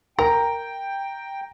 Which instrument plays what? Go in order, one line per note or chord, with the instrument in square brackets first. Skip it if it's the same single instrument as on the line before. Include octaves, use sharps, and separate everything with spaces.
[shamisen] A#4 [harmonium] G5 [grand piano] A#5